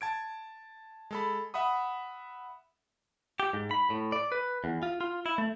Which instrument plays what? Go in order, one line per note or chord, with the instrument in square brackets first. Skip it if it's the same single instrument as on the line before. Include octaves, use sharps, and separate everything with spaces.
[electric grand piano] A5 G#6 D7
G#3 A4 B5
E5 F#5 B5 D#6
[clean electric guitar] G4
G#2
B5
A2
D5
B4
E2
F4
F4
E4
A3